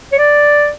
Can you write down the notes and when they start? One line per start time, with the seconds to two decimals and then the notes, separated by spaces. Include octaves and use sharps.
0.13 C#5
0.18 D5